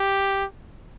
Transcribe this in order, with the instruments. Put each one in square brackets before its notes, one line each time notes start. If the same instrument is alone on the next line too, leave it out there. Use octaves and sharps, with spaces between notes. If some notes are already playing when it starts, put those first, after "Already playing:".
Already playing: [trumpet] G4